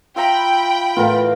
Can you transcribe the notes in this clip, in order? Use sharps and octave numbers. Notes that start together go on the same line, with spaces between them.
F4 E5 G5 A#5 B5
A2 E3 B3 F4 A#4 F5